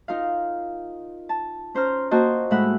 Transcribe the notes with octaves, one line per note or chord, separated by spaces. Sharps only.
D#4 F4 A#4 F5
A5
C#4 C5 A#5 F6
A#3 F#4 C5 D#5 A5
A2 G#3 E5 F#5 B5